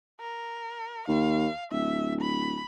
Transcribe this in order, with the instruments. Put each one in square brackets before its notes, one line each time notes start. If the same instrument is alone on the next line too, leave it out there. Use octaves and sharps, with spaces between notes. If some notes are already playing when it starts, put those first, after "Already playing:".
[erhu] A#4
[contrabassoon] D#2 [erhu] F5
[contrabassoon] D1 [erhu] E5
[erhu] B5